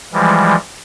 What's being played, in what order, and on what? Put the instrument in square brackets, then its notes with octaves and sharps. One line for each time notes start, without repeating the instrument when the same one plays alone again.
[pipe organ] E3 F3 G3 G#3